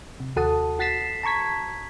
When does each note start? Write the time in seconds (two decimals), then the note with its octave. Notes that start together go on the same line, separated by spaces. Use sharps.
0.20 C3
0.36 D#2 F#4 A4 F#5 A5 D#6
0.79 F#4 F#5 A6 B6 C7 E7
1.23 A5 A#5 C#6 G#6 B6